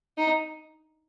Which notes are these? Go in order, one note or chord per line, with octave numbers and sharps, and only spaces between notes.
D#4